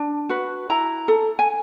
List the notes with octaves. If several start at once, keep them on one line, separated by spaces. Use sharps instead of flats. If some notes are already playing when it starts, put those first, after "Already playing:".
Already playing: D4
F#4 B4
E4 A#5
A4
G#5